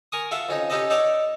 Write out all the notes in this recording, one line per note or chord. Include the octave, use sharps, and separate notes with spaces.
A#4 G#5 C#6 D#6
F4 A4 E5 F#5
F2 C#4 D#4
C#4 D#4 G4 A4 B4 D#5
D#4 A4 C#5 D5 F#5 D6